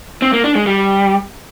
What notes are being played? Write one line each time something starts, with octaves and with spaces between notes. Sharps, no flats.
C4
A#3
D4
G#3
G3